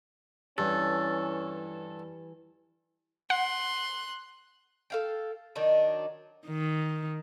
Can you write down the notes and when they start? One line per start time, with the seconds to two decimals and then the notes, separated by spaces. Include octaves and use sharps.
0.58 G2 E3 G3 C#4 A4
3.30 F#5 C6 F#6
4.90 A4 F5 G5
5.55 D#3 F#3 D4 D#4
6.47 D#3